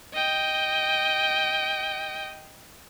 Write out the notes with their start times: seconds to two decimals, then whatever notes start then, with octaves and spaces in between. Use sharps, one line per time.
0.14 D#5 G5